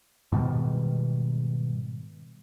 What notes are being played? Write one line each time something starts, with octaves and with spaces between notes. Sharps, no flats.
G#2 B2 D#3 G3